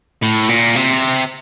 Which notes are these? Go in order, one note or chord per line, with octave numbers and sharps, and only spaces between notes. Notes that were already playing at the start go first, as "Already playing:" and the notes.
A2
A#2
C3